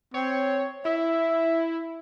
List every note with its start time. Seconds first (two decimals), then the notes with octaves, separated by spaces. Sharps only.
0.14 C4 C#5
0.85 E4 E5